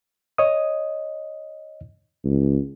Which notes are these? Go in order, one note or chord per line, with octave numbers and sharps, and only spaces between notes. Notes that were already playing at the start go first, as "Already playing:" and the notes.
C#5 D#5 D#6
C#2